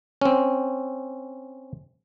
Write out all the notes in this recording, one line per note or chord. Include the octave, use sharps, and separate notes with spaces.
C4 C#4